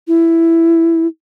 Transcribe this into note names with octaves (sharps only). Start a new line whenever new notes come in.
E4